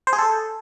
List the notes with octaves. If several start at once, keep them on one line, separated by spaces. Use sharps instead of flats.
C5
G#4
A4